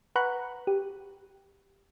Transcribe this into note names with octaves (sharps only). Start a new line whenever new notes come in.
B4 F#5 A#5 B5 C#6 F#6
G4